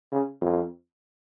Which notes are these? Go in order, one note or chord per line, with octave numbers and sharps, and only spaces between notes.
C#3
F2